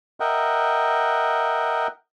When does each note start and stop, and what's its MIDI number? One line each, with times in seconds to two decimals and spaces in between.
0.20 1.87 70
0.20 1.87 75
0.20 1.87 76
0.20 1.87 78
0.20 1.87 79